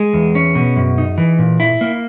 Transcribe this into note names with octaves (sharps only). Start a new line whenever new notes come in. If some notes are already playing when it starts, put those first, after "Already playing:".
Already playing: G#3 G#4
E2
C#4
B2
F#2
D#4
E3
A#2
E4
A#3